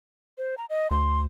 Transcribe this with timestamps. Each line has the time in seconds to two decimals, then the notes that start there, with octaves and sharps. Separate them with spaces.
0.38 C5
0.58 A#5
0.70 D#5
0.91 D2 C6